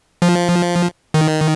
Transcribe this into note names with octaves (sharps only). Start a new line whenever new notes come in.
F3
D#3